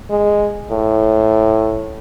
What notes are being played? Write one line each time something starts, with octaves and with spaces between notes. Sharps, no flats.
G#3
A2